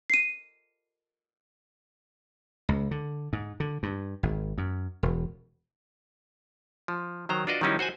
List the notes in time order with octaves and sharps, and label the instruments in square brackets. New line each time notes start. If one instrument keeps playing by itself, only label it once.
[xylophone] C7 D#7
[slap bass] C#2
D3
G#2
D3
G2
G#1
F#2
E1
[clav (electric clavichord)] F3
D#3 F#3 C5 A#5
D4 F4 F#4 B4 D5 D#5
D#3 F#3 G3 C#4 D#4 E4
F#4 C5 F#5 G#5